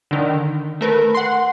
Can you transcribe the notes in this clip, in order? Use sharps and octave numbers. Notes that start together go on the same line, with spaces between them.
D3 D#3
A3 A#4 B4
F#5 C6